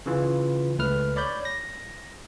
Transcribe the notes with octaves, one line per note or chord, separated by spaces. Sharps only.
C#3 E3 F4
C#2 A3 B4 F6
C#5 D5 B5 G6
A#6